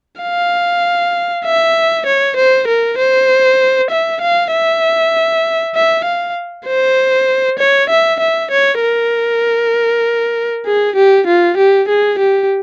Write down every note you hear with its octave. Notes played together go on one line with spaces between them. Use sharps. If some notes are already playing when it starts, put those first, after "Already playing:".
F5
E5
C#5
C5
A#4
C5
E5
F5
E5
E5
F5
C5
C#5
E5
E5
C#5
A#4
G#4
G4
F4
G4
G#4
G4